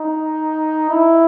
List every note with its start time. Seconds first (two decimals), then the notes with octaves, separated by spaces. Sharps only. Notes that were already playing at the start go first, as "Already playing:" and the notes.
Already playing: D#4
0.89 E4